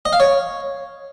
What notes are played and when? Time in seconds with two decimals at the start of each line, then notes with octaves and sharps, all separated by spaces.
0.05 D#5
0.13 F5
0.20 C#5